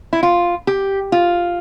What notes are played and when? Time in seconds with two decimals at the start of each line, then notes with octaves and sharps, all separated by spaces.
0.13 E4
0.23 F4
0.67 G4
1.12 F4